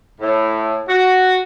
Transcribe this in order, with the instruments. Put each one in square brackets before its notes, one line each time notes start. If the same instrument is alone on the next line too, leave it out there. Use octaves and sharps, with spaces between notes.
[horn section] A2
F#4